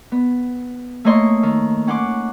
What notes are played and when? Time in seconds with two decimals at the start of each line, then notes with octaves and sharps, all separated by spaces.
0.12 B3
1.05 A3 A#3 C#5 D#5 C6
1.43 D#3
1.87 C#4 F#5 C6 D6